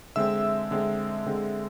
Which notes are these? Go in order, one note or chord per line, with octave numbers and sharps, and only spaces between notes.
D3 G#3 C4 E5 E6
D3 G#3 C4
D3 G#3 C4